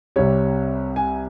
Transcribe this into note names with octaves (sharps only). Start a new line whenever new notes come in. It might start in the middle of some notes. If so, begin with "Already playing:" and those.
C2 C3 G3 C#5
G#5